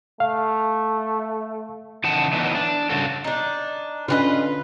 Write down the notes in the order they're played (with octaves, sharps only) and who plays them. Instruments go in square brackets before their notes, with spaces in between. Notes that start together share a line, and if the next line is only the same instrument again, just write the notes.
[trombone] A3 [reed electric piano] F5
[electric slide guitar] C#3 E3 D#4 F#5 A5
D3 E3 F#3 A3 B3 D#4
D4
G2 C#3 F#4 A4
[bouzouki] D4 D#4
[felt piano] D3 C#4 [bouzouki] F4 F#4 D#5 [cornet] B4